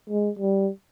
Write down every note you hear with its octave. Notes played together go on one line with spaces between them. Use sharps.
G#3
G3